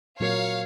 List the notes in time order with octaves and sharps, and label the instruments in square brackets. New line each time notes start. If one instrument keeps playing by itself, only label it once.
[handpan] A#2 F#3 C4 F#4 A#4 [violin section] C#5 F5